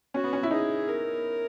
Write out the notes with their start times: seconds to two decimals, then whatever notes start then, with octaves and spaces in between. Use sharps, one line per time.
0.14 C#4 F#4
0.24 B3
0.33 C#4
0.43 E4
0.51 D#4 G#4
0.88 A#4